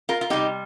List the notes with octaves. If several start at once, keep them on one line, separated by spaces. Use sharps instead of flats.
F4 A#4
F4
C3 G3 D#4 G4